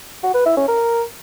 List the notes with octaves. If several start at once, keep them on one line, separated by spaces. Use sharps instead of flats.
F#4
B4
E4
C#4
A#4